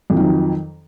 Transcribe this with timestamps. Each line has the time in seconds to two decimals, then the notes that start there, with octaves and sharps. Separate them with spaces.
0.10 F2
0.13 F3
0.17 D#3
0.20 F#3